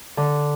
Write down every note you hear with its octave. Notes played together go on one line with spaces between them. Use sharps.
D3